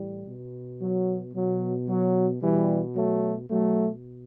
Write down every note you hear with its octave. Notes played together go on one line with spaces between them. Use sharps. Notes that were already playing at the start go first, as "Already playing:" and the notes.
Already playing: A2 E3 G3
B2
F#3
B2 F#3
F#3
B2 E3 G3
F#3 A3
B2 F#3 A3